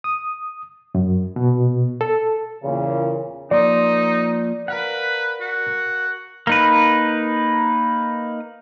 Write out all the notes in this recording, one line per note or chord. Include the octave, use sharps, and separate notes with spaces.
D#6
F#2
B2
A4
E2 A#2 C#3
F3 A#3 D#4 D5 C6
A#4 B4 F5 F#5
F#4
A#3 D#4 B4